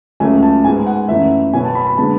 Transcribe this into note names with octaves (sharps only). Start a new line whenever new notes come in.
C#2 C#3 F#3 A3 G#5
A5
G#2 G#3 B3 G#5
F#5
F#2 E3 A3 E5
B2 F#3 B3 G#5
A5
B5
B5
D3 G#3 B3 A5